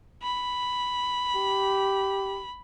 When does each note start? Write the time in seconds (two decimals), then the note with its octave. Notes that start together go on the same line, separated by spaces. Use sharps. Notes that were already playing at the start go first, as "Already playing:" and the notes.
0.23 B5
1.35 G4